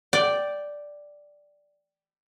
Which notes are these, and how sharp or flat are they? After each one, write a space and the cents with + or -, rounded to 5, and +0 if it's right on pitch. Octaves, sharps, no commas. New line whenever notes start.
D5 +0 G5 -5